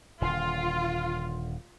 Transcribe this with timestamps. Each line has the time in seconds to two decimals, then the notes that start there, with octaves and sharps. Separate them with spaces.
0.22 D#1 D3 F4